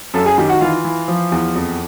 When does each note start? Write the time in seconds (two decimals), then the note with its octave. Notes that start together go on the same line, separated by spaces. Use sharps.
0.14 F#2 A4 A5
0.26 G#4 G#5
0.38 D#3 G4 G5
0.49 F#4 F#5
0.61 E3 F4 F5
0.85 E3
1.08 F3
1.32 E2
1.55 F2